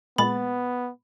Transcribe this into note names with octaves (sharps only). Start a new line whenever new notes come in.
A#2 G#3 B3 B5 A6